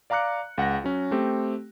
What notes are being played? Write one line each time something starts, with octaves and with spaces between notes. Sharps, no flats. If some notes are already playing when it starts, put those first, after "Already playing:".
D5 F5 A#5 D6 F#6 C#7
C#2 F#5 F#6 A#6
F#3 C#4
A3 C4 G4